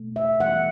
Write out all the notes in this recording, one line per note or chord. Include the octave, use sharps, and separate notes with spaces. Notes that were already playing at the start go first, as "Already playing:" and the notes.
Already playing: B2 A3
E5
E3 G3 B3 F#5